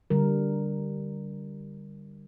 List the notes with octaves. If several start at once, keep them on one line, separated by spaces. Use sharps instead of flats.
D3 G3 A#4